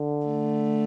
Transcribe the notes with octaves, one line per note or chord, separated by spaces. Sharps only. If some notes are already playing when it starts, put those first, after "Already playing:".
Already playing: D3
A3